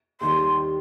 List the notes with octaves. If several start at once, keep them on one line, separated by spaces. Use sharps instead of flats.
D#2 D#3 G3 C6